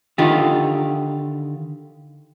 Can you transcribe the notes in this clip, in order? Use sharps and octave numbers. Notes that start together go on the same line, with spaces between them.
D3 D#3 F4 G4